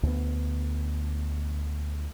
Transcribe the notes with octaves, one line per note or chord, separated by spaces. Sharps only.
D2 B3